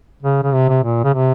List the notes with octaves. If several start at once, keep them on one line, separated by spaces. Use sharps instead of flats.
C#3
C#3
C3
C3
A#2
C#3
C3